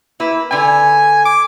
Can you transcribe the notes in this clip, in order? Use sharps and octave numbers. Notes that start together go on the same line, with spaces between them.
A#3 E4 B4
D3 B4 G#5
D6